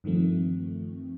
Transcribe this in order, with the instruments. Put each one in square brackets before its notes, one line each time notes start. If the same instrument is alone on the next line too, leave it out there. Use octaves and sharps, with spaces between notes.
[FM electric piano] G2 D#3 F3 A3 C4